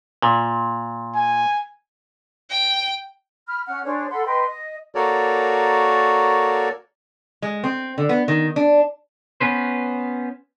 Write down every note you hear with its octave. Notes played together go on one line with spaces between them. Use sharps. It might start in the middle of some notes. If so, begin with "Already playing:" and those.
A#2
G#5
G5
B5 F6
C#4 F#5 F6
D4 G#4 C5 C#5
A4 F#5 B5 C6
B4 D#5 G5 C6
D#5
A#3 F#4 A4 A#4 C#5 D5
G#3
C4
D3
B3
D#3
D4
B3 C#4 B4 C5